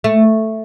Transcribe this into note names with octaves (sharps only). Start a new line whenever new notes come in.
A3